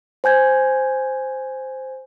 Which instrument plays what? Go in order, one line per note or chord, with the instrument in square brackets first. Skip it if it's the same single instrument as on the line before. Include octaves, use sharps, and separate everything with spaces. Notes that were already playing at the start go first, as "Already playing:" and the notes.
[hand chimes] C5 G#5 G6 G#6